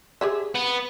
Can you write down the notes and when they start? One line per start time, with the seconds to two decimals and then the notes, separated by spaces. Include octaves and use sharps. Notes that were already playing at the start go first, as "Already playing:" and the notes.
0.21 G4 G#4 E5
0.55 B3